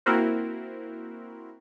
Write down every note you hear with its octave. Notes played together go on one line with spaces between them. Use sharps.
A#3 C4 E4 F#4 A#4 C5